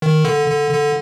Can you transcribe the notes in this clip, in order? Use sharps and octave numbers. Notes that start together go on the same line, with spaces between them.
D#3
D3
D3
D3